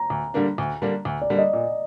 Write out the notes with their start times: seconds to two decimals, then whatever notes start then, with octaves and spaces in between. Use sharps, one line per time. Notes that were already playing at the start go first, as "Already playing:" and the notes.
Already playing: A#5
0.10 D2
0.34 D3 G3 A#3 D4
0.58 D2
0.82 D3 G3 A#3 D4
1.05 D2
1.22 D5
1.30 D3 G3 A#3 D4
1.38 D#5
1.53 A#2